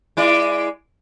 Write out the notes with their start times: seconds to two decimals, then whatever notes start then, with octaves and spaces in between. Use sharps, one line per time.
0.17 G#3 E4 D5